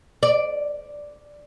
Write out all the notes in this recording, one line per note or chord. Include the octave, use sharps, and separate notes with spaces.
D5